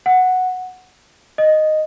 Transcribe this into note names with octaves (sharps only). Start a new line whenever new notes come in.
F#5
D#5